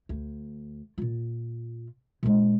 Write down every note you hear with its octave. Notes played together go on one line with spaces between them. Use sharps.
D2
A#2 F4
A#2 G#3